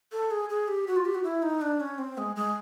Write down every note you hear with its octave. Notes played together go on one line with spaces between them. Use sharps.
A4
G#4
G#4
G4
F#4
F4
G4
F#4
E4
D#4
D4
C#4
C4
G#3
G#3